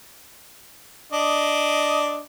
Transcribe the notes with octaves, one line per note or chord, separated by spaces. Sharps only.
D4 D#5